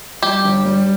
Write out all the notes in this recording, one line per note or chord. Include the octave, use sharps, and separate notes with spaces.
G3 G4
G1
G3